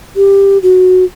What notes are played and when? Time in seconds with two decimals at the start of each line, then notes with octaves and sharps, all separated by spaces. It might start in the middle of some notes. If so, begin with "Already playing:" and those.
0.16 G4
0.63 F#4